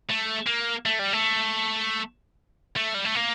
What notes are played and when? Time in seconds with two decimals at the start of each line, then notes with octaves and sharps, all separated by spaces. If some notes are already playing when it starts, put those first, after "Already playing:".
0.09 A3
0.47 A#3
0.86 A3
0.99 G3
1.13 A3
2.77 A3
2.95 G3
3.05 A3
3.15 A#3